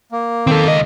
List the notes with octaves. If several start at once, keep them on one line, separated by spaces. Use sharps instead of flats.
A#3
D#3 C4 A4
C#2 D#5